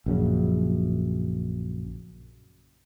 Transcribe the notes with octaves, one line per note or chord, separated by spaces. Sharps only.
A#1 F#2 C#3